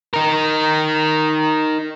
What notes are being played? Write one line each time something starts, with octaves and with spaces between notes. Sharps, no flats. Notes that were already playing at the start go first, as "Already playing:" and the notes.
D#4 A#4